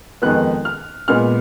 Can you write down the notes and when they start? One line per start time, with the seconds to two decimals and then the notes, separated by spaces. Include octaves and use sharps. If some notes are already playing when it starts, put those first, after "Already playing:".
0.22 F2 D#3 G#3 B3 F#6
0.65 F6
1.08 A#2 G#3 B3 F6